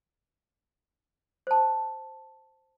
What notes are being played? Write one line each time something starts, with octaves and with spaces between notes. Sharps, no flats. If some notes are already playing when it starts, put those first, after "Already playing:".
C5 A5